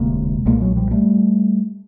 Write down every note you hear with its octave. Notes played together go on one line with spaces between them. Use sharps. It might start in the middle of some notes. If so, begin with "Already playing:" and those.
Already playing: E1 D2 C3 G#3 A#3
B1 A#2 G#3 A#3
F#3 G#3
F3 G3
G3 A3